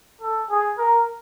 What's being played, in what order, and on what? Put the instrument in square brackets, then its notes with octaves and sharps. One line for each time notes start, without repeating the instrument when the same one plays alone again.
[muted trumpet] A4
G#4
A#4